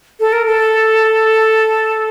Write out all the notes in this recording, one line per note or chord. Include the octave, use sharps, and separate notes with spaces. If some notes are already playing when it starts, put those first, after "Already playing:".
A4
A#4
A4